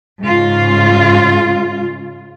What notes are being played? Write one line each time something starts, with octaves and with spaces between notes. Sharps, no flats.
G#2 C#3 F4